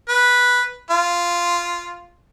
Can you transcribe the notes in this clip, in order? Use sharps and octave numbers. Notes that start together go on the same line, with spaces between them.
B4
F4